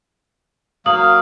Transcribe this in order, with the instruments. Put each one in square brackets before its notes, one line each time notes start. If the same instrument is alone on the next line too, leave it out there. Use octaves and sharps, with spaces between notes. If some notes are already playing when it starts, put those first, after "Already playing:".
[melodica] F#3 A#3 F5 [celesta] D#6 F6 F#7